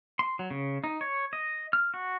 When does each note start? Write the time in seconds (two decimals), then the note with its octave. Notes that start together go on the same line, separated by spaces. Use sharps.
0.19 C6
0.39 F#3
0.51 C#3
0.84 D#4
1.01 C#5
1.33 D#5
1.73 F6
1.94 F#4